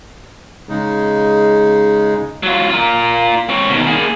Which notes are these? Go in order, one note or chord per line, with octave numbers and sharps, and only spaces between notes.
C#3 G#3 D#4
F#3 F4
F4 A#4
C4 C#5
B2 D#3
A#3 G#4